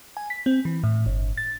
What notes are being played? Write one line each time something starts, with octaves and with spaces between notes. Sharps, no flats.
G#5
B6
C4
E3
A2
G1
A6